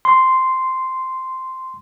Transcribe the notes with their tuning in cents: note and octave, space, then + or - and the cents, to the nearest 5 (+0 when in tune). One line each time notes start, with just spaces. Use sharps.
C6 -5